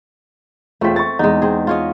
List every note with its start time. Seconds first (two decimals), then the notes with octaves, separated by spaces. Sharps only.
0.81 E1 A3 C4 F4 B6
0.96 C#6 A6
1.19 E2 G#3 D#4
1.42 C4 G#4
1.67 F4 C#5 D#5